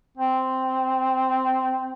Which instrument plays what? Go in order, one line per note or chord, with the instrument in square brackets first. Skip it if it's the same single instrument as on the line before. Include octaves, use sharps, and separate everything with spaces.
[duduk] C4